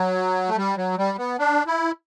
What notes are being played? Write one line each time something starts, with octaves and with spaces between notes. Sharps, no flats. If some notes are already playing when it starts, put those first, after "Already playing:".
Already playing: F#3
A3
G3
F#3
G3
B3
D4
E4